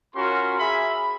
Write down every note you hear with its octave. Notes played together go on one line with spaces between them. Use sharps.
C#4 F4 F#4 A#4 B5 C6
G#4 E5 B5